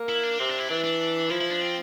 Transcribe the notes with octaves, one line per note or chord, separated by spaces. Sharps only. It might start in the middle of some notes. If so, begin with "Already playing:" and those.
Already playing: A#3
E4
D4
C3 C4
D4
E4
E3 D4
D4
F3 E4
E4
D4
C4